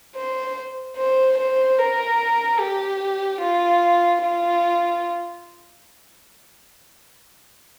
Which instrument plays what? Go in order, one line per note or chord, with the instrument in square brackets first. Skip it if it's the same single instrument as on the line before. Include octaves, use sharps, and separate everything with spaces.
[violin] C5
C5
C5
A#4
G4
F4
F4